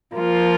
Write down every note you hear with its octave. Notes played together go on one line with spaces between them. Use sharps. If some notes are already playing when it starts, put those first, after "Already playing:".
F3 A#3 F4